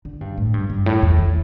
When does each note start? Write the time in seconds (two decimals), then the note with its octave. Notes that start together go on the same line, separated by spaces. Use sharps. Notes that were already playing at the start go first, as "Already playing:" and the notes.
0.05 D3
0.21 G2
0.38 A2
0.54 G2
0.70 G2
0.86 A2
1.02 E2
1.18 E3